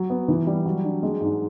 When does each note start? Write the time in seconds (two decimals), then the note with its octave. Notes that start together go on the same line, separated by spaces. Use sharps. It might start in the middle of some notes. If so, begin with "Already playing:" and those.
Already playing: F#3
0.10 B3
0.28 E3
0.47 G3
0.66 F#3
0.84 D4
1.03 G#3
1.21 G#2